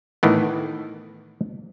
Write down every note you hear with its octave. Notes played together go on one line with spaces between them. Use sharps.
A2 D#3 E3 B3